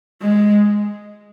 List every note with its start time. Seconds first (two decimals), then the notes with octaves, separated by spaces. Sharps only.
0.22 G#3